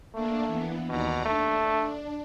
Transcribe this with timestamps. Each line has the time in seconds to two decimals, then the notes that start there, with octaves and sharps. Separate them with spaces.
0.14 A3 A#3 D4
0.46 E3 B3
0.89 D#2 B2 D5 A#5
1.25 A3 D4